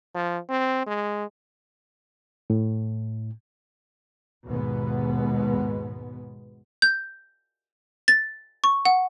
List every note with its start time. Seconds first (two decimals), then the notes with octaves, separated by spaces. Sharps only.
0.14 F3
0.49 C4
0.86 G#3
2.50 A2
4.46 D#2 G#2 B2 G#3 B3
6.82 G6
8.08 A6
8.64 C#6
8.85 F#5